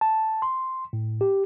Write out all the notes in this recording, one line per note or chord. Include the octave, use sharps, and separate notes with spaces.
A5
C6
A2
G4